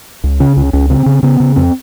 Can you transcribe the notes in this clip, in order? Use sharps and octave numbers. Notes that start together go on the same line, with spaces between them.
C#2
C#3 C#4
C#2 C#4
C#2 C#4
C#3 C4
C#3
C#3 B3
C#3
F2 C4